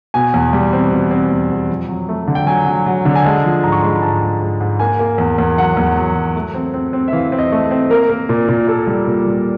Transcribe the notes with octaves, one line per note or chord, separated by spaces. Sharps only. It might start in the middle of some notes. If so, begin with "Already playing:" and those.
B2 G#5
E2
G3
C4
B2
C4
E2
E2
F2
F#3
A3
D3
G5
F#3 G#5
F#3
F#3
D3
G#5
G#3 A5
F3
G#2 A#5
C#6
C6
G#3 B5
A#5
G#2 A5
G#2
G#2
G#2
A#3 G#5
A#3
E2
E2
F#3 F#5
E2
F#3
F#3
A3
C4
C4
C4
E5
E3 F5
C4
D#5
A3
C4
A#3 A#4
A#3
A#2
A#2
A#2 A4
G3
A#2
G3